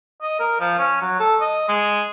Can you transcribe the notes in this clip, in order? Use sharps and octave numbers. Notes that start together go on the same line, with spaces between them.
D#5
A#4
F3
C#4
F#3
A4
D#5
G#3